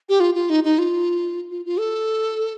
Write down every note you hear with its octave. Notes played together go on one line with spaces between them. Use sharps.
G4
F4
F4
D#4
D#4
F4
F4
F4
A4